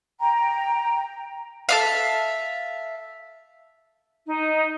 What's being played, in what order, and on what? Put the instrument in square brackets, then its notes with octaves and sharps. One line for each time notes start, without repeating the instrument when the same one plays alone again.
[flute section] G5 A#5
[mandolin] A4 E5 F5
[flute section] D#4